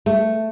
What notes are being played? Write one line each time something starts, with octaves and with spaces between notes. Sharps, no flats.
A3